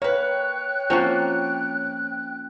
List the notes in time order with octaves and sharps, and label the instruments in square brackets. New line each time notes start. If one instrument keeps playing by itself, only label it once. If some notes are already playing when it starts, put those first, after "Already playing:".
[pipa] A#3 B4 [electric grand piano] C#5 [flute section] G5 F#6
[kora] F3 A#3 C#4 [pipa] C4 F4 F#4